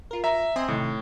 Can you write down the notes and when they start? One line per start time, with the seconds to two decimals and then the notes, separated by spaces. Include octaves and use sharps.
0.11 F4 A#4
0.24 E5 A#5
0.56 C4 D#5 G#5 C6
0.68 A2 C3 D#3